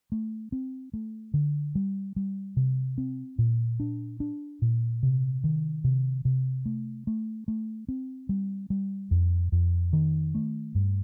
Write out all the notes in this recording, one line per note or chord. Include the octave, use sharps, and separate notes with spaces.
A3
C4
A3
D3
G3
G3
C3
C4
A#2
D4
D4
A#2
C3
D#3
C3
C3
A3
A3
A3
C4
G3
G3
F2
F2
D#3
A3
G2